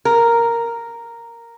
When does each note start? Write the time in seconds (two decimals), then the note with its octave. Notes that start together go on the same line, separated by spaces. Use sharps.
0.05 A#4